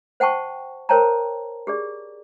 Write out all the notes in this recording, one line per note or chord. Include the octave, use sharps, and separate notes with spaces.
C5 F#5 G5 A5 C#6
A#4 C5 C#5 G5 A5 A#5
G4 G#4 D5